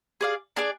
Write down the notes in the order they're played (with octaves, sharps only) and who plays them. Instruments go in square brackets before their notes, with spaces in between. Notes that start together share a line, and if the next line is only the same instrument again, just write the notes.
[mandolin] G#4 D5 F5
D4 G#4 D5